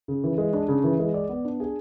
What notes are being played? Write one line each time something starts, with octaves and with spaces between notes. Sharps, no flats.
C#3
E3
G#3
D4
C#3
E3
G#3
D5
B3
D4
G#4